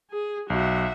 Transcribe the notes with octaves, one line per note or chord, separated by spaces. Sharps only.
G#4
B1 F#4 E5